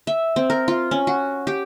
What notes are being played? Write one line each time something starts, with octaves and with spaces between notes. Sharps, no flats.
E5
C4
A#4
F4
C#4
F#4
G4